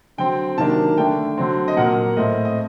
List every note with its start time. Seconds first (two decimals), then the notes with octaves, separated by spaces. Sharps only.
0.18 D3 F#3 C4 G5
0.58 C3 D#3 F#3 A#3 D4 A5
0.97 D3 A3 D4 G5
1.38 D3 F#3 C4
1.68 D#5
1.76 A#2 F#3 A#3 F#5
2.17 A2 A3 C4 D#5
2.45 D#5